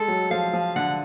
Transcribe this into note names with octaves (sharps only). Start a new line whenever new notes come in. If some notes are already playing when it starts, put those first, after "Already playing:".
Already playing: G#3 A4
F#3
F3 F5
F3
D3 F#5